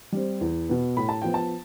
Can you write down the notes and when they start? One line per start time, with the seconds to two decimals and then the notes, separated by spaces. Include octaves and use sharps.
0.12 G3 C4
0.41 E2
0.69 B2 B3
0.97 A2 B5
1.09 A5
1.22 F3 B3 G5
1.34 A5